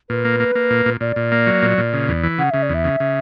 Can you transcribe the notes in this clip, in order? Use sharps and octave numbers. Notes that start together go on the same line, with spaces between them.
A#2 B4
A#3
A#3
A#3
A#2
A#2
A#2 D5
A#2
A#3
F#3
A#2
A#2
C#3
E2
E3
C#3 F#5
C#3 E5
D5
E2 E5
C#3
C#3